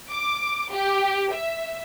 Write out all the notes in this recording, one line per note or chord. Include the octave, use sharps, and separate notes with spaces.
D6
G4
E5